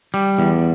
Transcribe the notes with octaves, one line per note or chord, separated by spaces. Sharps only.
G3
E2